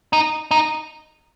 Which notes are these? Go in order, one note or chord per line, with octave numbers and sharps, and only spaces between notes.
D#4
D#4